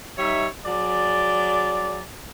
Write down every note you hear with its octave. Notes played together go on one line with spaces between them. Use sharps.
G3 D#4 C#5 E5
F#3 G#4 D5